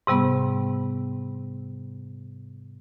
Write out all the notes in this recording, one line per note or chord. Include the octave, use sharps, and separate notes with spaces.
G#2 C3 G3 B3